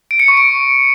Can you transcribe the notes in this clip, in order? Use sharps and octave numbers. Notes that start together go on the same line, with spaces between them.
D7
C#7
C#6
D7